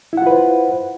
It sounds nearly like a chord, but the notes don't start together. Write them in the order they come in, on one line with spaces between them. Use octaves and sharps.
E4 F#5 F4 B4 C5